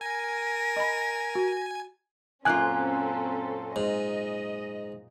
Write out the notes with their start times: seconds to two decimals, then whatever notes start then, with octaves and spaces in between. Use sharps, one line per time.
0.01 A#4 G#5 A#6
0.76 D#5 B5
1.35 F#4
2.45 F#2 A#2 C4 C#4 F4 A4 G#5 F#6
3.76 G#2 D#5